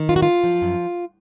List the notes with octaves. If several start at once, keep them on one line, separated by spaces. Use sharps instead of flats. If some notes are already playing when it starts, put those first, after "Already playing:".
Already playing: D#3
F#2 F4
F#4
F#2 F4
F3
F#2